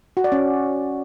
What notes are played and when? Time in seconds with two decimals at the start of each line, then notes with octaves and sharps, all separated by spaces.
0.17 F#4
0.24 D5
0.32 C#4